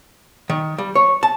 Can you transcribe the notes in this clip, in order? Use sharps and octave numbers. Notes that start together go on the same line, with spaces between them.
D#3
G3
C#5
A5